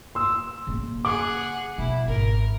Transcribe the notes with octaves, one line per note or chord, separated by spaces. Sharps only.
C6 E6
C#3 A#3
G#4 F#5 D6
B2 E4
G#1 A#4